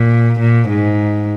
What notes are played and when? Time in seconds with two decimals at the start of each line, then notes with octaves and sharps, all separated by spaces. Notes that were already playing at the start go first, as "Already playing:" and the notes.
Already playing: A#2
0.40 A#2
0.69 G#2